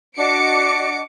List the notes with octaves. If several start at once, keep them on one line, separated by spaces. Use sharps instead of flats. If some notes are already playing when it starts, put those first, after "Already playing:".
D4 F#4 D#5 D6 C#7 D7